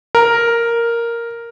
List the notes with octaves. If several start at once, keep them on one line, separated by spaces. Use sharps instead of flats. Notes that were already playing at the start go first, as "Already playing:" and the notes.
A#4